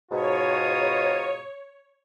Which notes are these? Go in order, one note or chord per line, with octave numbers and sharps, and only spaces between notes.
G#2 B2 F4 C#5 A#5 D#6